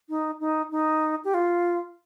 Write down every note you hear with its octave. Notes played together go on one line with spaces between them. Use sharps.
D#4
D#4
D#4
G4
F4